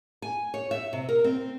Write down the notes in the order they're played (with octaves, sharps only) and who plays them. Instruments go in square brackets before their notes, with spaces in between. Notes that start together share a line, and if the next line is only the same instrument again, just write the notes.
[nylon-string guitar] G#5
C#5
E5
C3
A#4
C4